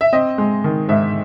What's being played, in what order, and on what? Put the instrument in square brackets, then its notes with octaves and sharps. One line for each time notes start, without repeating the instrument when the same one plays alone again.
[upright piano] E5
C4 D#5
G#3
D#3
G#2 E5